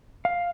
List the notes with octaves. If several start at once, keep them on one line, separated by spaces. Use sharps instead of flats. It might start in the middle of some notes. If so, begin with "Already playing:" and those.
F5